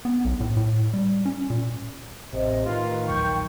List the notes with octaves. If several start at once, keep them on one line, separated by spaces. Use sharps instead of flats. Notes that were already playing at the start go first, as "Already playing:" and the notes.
B3
B1
A2
A2
G3
C#4
A#2
A1 C3 D#5
A2 D#3 F4 B4
A#1 D#2 F#3 G5 C#6 G6